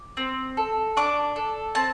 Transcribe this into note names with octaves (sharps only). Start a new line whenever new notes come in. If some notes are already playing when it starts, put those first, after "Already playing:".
Already playing: D6
C4
A4
D4 D6
A4
C4 A5